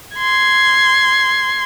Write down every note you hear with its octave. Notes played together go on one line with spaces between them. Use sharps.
C6 G#6